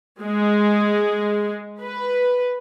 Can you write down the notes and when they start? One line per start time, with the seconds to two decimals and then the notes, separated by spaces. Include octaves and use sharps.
0.21 G#3
1.82 B4